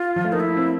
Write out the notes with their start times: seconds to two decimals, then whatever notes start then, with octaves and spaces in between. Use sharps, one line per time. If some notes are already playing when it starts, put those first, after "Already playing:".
Already playing: F4
0.16 F3
0.24 A3
0.32 A#3 D#4
0.40 E4
0.57 C4